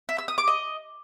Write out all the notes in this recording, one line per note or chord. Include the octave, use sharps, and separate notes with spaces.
E5
E6
D#6
D6
D#5